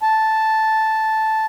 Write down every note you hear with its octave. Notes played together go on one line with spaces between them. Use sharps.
A5